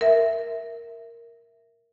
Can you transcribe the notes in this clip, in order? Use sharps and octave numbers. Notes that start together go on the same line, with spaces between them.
A#4 E5